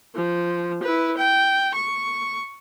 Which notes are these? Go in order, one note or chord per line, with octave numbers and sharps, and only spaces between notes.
F3
E4 B4
G5
C#6